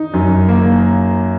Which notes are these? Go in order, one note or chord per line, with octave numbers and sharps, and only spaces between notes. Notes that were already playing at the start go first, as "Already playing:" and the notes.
Already playing: D#4
F#2
A#3